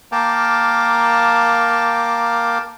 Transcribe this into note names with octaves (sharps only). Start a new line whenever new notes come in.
A#3 A#4 F5 G5 A5 D6